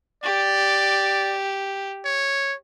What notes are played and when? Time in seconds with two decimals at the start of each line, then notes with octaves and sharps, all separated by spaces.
0.23 G4 D5
2.05 C#5